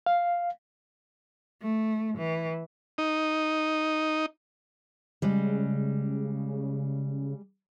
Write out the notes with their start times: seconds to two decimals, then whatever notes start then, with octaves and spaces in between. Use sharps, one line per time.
0.06 F5
1.62 A3
2.18 E3
2.98 D#4
5.22 C#3 G3 G#3